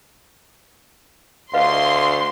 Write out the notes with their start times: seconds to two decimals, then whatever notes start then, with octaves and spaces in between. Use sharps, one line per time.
1.54 D2 B4 D#5 F5 C6